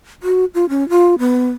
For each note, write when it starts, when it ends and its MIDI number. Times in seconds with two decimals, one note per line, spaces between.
0.23 0.45 66
0.54 0.68 65
0.69 0.88 61
0.90 1.15 65
1.19 1.50 59